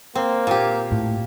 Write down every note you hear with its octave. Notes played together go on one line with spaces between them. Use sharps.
A#3 C4
A#2 G4
A2